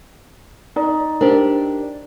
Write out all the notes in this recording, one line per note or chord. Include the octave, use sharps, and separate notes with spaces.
D#4 D5
D4 G4 A#4 C5